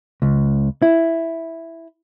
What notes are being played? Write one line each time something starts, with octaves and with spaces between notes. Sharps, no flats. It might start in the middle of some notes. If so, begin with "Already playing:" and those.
C#2
E4